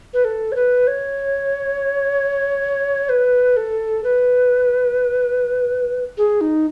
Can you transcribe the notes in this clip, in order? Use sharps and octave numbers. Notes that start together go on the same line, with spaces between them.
B4
A4
C#5
B4
C#5
B4
A4
B4
G#4
D#4